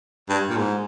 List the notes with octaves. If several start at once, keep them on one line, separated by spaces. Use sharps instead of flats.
G2
A#2
G#2